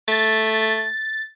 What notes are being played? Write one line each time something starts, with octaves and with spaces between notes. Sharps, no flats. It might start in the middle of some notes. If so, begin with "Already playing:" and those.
A3 A6